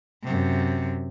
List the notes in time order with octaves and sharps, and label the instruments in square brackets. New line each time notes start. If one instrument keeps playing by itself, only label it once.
[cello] F#2 C3